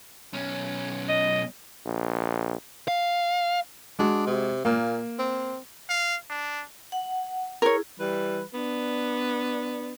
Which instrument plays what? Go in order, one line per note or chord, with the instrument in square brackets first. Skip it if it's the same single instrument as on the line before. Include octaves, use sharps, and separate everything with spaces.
[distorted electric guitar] B1 C#4
[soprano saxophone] D#5
[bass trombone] A#1
[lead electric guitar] F5
[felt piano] G#3 F#4 [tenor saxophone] D4
[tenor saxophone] C3
[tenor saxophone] A#2 [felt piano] A#3
[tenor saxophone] C4
[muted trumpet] F5
D4
[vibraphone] F#5
[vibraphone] E4 G#4 [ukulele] A#4 C#5
[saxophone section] E3 G3 B4
B3 D4